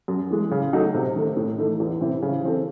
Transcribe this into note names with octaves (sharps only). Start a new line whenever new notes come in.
F#2
E3 G#3
C#3
F#3 A3 D#4
C3
D#3 A3
A2
E3 A3 D#4
E2
C3 E3 C4 E4
C#3
E3 C4 E4 A4